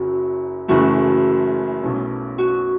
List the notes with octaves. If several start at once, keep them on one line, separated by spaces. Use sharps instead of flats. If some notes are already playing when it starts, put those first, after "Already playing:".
Already playing: F#1 F#2 F#3 F#4
F#1 F#2 C#3 E3 A3 F#4
B1 B2 A3 C#4 E4
F#4